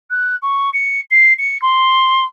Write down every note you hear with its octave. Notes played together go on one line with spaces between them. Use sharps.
F#6
C#6
C#7
C7
C#7
C6